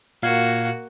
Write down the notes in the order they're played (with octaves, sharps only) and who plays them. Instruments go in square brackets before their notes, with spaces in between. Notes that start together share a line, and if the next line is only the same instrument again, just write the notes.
[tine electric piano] A#2 F5 G#6 [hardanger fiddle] A#3 F#4